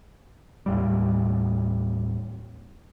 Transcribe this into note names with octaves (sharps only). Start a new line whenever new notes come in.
D#2 A2 G3